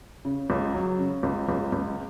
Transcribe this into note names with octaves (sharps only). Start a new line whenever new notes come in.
C#3
C#2
F#3
C#3
C#2
C#2
C#2